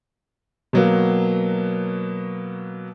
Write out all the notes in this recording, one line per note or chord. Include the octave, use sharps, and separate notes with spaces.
B2 F#3 A#3